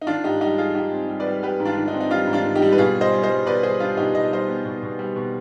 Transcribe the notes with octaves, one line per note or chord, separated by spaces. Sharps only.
D#4
D#3 D4 F4
G#2 D#4 G4
G3 D#4 G4
G3 F4 G#4
G#2 D#4 G4
C4
G3
B4 D5
G3
G3 G4 B4
G#2
D4 F4
D#3
D#4
C4
D#4
G3 D4 F4
G#2
D4 F4
D#3
D#4 G4
G3
B4
B2 F4 G#4
G3
C5 D#5
G3
C5 D#5
G3
B2 B4 D5
G3 G#4 C5
G3 D4 F4
B2 D#4 G4
B2 D#5
G3 C5 D#5
B3
B2
B2
G3
B2